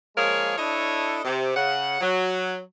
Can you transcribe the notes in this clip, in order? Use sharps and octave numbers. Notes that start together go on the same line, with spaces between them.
F3 G#3 A#3 G#4 A#4 C#5
D4 E4 A4 C#5 D#5
C3
C#3 F#5
F#3